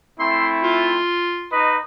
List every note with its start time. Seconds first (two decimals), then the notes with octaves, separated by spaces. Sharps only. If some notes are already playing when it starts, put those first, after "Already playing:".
0.20 A3 C4 E4 C6
0.63 F4
1.52 D#4 B4 D#5